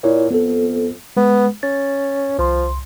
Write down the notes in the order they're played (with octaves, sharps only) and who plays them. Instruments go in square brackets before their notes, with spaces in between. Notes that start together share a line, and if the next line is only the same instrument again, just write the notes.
[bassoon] A#2 [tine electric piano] E4 C#5 D5
[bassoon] F2 [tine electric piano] B3 A4
[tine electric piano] G#3 [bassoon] B3
[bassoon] C#4 [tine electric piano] A6
[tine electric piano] C2 C6 [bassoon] F3